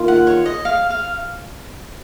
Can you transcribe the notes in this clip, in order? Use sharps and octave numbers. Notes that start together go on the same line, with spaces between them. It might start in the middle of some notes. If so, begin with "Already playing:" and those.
Already playing: D#3 A#3 F4
F#5
C#5
D#5
F5
F5